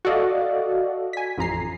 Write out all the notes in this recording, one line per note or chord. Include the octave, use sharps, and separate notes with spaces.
F#4 A4 D5 D#5 F5
G#5 B6
A1 F2 A#5 C7